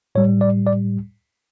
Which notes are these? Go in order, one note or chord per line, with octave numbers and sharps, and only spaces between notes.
A2 G3 C#5
D5
D5